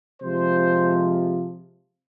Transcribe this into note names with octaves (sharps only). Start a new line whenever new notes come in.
C3 F3 G#3 C5